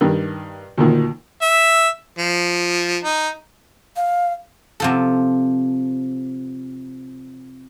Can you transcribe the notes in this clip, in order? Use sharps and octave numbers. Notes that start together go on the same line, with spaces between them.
G2 D#3
D2 A#2 D#3
E5
F3
D#4
F5
C3 F3 A4